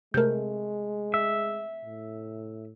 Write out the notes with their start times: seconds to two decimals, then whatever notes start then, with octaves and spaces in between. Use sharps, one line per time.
0.14 C3 G#3 A3 A#4 G6
1.14 E5
1.85 A2